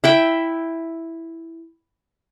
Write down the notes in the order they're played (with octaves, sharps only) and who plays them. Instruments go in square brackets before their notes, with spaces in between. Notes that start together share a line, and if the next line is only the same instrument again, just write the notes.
[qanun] E4 E5 G5